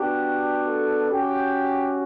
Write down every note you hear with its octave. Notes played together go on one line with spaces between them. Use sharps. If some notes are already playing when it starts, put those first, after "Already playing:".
Already playing: B3 D4 F#4 G4
A4
C#4 F#4 G4